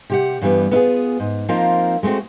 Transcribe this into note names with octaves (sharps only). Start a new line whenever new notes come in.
C3 G4 F#5
G2 E3 G3 B3
B3 E4 F4 G#4
G#2
F3 A#3 C4 D#4 F4 A#4
G#3 A3 B3 C4 F#4